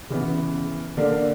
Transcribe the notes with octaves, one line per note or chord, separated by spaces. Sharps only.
C#3 E3 B3
D3 A#3 D4